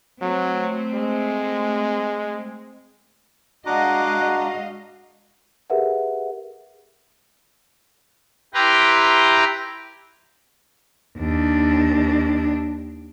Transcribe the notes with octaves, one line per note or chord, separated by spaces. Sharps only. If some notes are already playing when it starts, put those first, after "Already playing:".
F#3 A3 C4
G#3
G#3 D4 F#4 D#5 F5 F#5 A#5 D6
G4 G#4 A#4 B4 E5 F#5
E4 G4 B4 G5 A#5 C6
D#2 D4